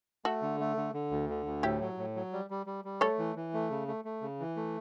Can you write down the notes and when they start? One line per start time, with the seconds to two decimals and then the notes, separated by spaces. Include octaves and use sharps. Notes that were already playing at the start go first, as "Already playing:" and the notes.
0.25 A3 F#4 A4
0.42 D3
0.60 A3
0.77 D3
0.94 D3
1.11 D2
1.29 D3
1.46 D2
1.63 A2 E4 G4
1.81 F#3
1.97 A2
2.15 F#3
2.33 G3
2.50 G3
2.66 G3
2.85 G3
3.01 A3 A4 C#5
3.19 E3
3.36 E3
3.54 A3
3.70 C#3
3.88 A3
4.05 A3
4.21 C#3
4.40 E3
4.56 A3